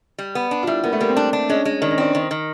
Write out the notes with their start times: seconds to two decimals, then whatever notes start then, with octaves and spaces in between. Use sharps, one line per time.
0.18 G3
0.35 B3
0.51 D4
0.63 F4
0.67 G3 E4
0.84 A#3 B3
0.93 A3
1.00 G3 A#3
1.09 C4
1.17 D4
1.33 D4
1.49 G#3 C#4
1.65 G#3
1.82 D#3 D4
1.91 C#4
1.98 C4 D4
2.15 D#3
2.31 D#3